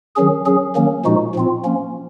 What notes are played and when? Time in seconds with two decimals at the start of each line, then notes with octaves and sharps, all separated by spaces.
0.16 D#3 F#3 C#4 G#4
0.46 F#3 C#4 G#4
0.75 D#3 F#3 A#3 C#4
1.05 A#2 F3 G#3 D#4 F#4
1.35 A#2 F3 C4 F4
1.64 F3 A#3 C#4